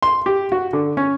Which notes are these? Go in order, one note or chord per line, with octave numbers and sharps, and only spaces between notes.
C6
G4
F#4
D3
C#4